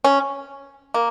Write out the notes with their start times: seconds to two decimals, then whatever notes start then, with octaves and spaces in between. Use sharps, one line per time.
0.04 C#4
0.94 A#3